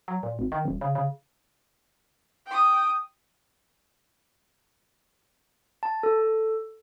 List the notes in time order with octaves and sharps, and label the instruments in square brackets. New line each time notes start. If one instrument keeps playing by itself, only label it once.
[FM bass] F#3
A#2
G#1
D#3
D#1
C#3
C#3
[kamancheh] G5 D#6
[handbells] A5
A4